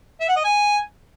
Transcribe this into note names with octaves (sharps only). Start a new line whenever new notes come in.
E5
F#5
D#5
G#5